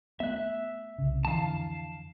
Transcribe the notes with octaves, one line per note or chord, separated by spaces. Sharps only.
A3 B3 E5 F#6
C2 C#3
F2 D3 E3 F5 A5